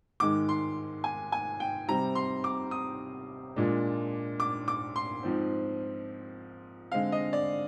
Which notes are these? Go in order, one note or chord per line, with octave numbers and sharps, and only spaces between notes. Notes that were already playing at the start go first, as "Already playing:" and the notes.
G#2 D#3 G#3 D6
C6
G#5
G#5
G5
C3 G3 C4 A#5
C6
D6
D#6
A#2 G#3 D4
D6
D6
C6
G#2 F3 C4
D3 G#3 C4 F5
D#5
D5